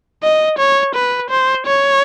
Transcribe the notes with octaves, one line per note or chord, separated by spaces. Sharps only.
D#5
C#5
B4
C5
C#5